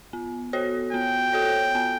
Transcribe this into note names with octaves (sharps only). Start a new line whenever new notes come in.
B3
F#4 A4 C#5
B3 G5
F#4 A4 C#5
B3